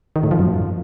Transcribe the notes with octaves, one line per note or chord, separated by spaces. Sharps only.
D#3
A2
F3
F#2